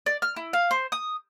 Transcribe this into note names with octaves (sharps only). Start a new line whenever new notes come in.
D5
F6
E4
F5
C5
D#6